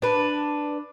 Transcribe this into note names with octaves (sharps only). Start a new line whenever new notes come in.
D4 B4